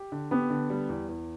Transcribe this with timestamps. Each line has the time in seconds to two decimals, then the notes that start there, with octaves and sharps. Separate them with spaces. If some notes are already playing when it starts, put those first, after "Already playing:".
Already playing: G4
0.12 D3
0.31 B3 G4
0.50 D3
0.70 G3
0.89 E2
1.09 E2